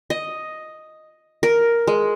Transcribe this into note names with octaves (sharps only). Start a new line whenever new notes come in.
D#5
A#4
G#3